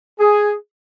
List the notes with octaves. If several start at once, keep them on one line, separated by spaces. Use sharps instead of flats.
G#4